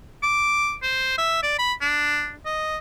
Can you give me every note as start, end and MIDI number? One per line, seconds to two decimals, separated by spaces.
0.23 0.75 86
0.83 1.17 72
1.18 1.41 76
1.43 1.59 74
1.59 1.73 83
1.81 2.33 62
2.45 2.78 75